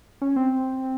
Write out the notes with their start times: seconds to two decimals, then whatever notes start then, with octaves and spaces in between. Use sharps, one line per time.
0.21 C#4
0.36 C4